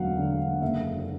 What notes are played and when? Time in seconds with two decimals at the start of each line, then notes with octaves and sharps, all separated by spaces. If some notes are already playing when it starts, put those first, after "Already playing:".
Already playing: E1 D2 F#3 F5 F#5
0.18 D3
0.62 F#1 E5